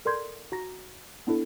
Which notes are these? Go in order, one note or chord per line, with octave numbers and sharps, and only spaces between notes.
A4 A#4 D5 C6 G6 G#6
F#4 A#5 A#6
B3 D4 E4 A4